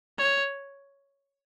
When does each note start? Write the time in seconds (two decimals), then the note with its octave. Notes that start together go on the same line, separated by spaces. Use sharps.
0.18 C#5